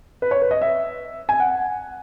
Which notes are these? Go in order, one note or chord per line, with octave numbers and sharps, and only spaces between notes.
B4
C#5
B4
D#5
E5
G#5
F#5